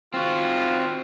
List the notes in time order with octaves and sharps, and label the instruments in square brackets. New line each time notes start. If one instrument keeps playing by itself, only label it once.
[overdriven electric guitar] C4 F#4 [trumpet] F4